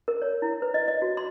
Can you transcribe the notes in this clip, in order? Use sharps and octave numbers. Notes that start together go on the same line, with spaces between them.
A#4
C#5
E4
B4
D#5
D#5
F#4
C6